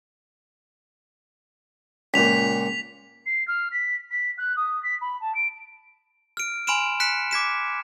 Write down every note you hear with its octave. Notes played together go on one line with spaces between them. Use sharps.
C#2 A#2 B6 F7
C7
F6
B6
B6
F#6
D#6
B6
B5
A5
D7
F6 D7
G#5 B5 C6 F6 D7 E7
F#6 B6 C#7 E7
D6 G#6 B6 E7